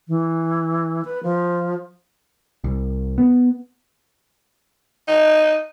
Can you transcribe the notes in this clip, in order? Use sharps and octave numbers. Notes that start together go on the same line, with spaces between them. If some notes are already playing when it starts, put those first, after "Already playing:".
E3
B4
F3
C2
B3
D#4